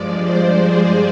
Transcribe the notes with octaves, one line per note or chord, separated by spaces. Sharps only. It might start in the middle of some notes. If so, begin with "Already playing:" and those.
Already playing: G2 F3 G#3 D5
C5
G#4